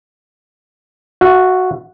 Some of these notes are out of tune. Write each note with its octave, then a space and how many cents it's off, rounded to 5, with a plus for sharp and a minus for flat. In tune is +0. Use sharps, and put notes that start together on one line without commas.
F#4 +0 E5 +45 A5 +0